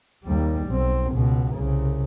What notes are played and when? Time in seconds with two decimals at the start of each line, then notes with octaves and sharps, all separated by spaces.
0.24 D#2 G3
0.69 B1 C4
1.11 C#2 B2
1.55 C2 C#3